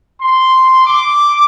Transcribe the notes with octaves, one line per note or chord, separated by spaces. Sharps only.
C6
D6